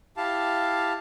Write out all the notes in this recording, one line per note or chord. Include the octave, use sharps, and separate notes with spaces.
E4 G4 F5 A5